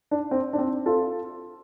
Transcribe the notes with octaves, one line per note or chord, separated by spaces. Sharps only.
D4
C4
D4
C4
F4 A4